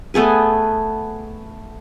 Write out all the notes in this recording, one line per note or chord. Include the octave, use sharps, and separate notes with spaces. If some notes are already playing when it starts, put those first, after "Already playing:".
A3 B3 G#4 B4